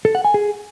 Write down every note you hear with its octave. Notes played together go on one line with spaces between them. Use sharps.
A4
F#5
G#5
G#4